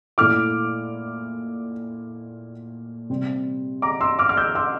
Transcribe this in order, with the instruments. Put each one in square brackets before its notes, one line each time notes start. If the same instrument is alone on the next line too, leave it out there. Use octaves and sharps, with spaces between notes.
[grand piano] A#2 A3 E4 D6 F6
C3 G3 C4
A#5 D6
C6 E6
D6 F6
F6
E6 G6
C6 E6